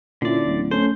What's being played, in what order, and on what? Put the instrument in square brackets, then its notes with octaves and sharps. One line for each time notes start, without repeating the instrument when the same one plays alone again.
[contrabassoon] A#2 [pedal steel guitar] D3 D5 [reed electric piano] C#4 E4
[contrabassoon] D1
[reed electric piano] A3 C#4 A4 [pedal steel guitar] C5